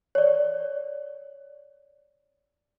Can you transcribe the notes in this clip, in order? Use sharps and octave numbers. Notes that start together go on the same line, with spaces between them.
C#5 D5